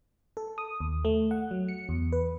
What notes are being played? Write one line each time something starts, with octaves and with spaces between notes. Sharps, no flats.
A4
D#6
D#2
A3
F#5
F#3
C#7
E2
B4